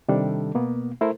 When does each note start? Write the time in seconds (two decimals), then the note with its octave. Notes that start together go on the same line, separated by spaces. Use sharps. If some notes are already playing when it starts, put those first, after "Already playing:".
0.08 C3 D#3 G3 D4 A4
0.55 B2 A#3 B3
1.01 A3 E4 A4 A#4 C5